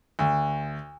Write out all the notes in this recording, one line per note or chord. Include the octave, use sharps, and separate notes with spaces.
D2